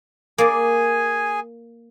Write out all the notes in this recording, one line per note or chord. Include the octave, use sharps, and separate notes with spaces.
A#3 G#4 D5 G#5